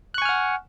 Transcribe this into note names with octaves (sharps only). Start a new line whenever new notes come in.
F#5 G#5 C#6 F6 F#6